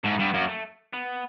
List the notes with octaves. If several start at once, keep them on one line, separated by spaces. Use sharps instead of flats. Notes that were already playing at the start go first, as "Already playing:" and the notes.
G#2 A3
G2 B3
F#2 A#3
A3
B3